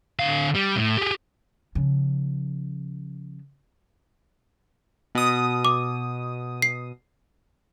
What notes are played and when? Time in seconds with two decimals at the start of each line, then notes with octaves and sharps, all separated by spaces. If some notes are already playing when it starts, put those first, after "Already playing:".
0.19 D3 F5
0.55 G3
0.77 A2
0.97 G4 G#4
1.75 C#3 F3
5.15 B2 D#6
5.65 D6
6.62 C7